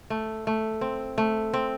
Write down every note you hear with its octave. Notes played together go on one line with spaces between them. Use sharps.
A3
A3
C4
A3
C4